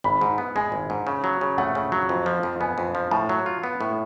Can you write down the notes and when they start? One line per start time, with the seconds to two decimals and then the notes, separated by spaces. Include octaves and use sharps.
0.04 G#1 B5
0.21 G#2
0.38 B3
0.55 G#3 G#5
0.72 G#1
0.90 G#2
1.07 C#3
1.24 F#3
1.41 C#3
1.58 A3 F#5
1.75 C#3
1.92 F#3
2.09 F2
2.26 F3
2.43 F2
2.60 B3 G#5
2.78 F2
2.95 F3
3.11 A2 A5
3.29 F#3
3.46 F4
3.64 B3
3.81 A2